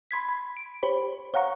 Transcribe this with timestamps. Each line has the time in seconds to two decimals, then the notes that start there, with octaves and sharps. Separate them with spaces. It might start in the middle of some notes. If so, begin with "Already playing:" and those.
0.11 B5 C6 G#6 B6
0.29 B5
0.57 D7
0.83 G4 C5 C#5 B5
1.34 C#5 F5 F#5 A#5 C#6